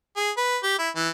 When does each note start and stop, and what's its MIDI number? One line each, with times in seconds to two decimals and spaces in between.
0.17 0.31 68
0.37 0.58 71
0.63 0.78 67
0.79 0.89 64
0.96 1.09 52